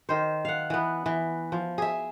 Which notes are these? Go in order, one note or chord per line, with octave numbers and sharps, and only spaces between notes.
D#3 C5
F5 F#5
E3 B3
E3
F3
G#4 E5